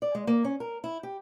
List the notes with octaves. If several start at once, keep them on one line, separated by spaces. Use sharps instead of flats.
D5
G#3
A#3
C#4
A#4
E4
G4